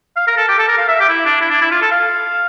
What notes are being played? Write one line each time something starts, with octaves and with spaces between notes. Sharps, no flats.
F5
A#4
A4
G4
A4
A#4
F5
E5
G4
E4
D4
E4
D4
E4
F4
A4
F5